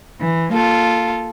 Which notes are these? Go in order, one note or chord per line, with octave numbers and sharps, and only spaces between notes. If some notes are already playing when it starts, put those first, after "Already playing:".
E3
A#3 F4 A4